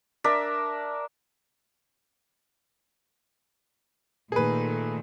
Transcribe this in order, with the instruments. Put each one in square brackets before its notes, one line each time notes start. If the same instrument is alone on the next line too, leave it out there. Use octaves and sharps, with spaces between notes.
[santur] D4 A#4 E5
[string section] A#2 D#3 A3 [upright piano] G#4 B4